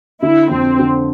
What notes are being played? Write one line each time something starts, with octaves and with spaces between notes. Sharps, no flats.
D3 E4
F2 C4
D3